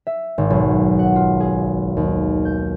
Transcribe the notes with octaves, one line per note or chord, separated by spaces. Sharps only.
E5
G#1
B1
F#5
F4
G#4
D#2
G6